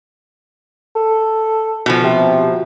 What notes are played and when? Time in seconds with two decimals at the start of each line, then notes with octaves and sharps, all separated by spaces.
0.95 A4
1.86 B2 F3
2.04 C3